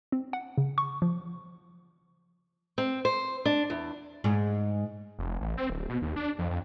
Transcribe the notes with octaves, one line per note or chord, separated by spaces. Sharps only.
C4
F#5
C#3
C#6
F3
C4
C5
D4
E2
G#2
F1
A1
C4
D1
B2
D#2
D4
F2
F2